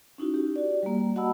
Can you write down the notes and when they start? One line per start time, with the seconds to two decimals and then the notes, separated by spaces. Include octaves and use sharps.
0.18 C#4 D#4 E4 F#4
0.34 G4
0.56 F#4 D5
0.83 G3 A#3
1.16 F#4 D#5 F#5 A5 B5 E6